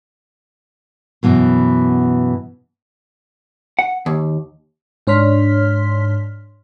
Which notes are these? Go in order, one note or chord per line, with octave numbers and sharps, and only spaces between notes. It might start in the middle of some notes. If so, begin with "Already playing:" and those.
F#2 B2 E3
F#5
D#2
G#2 D4 C#5 C6 F6 B6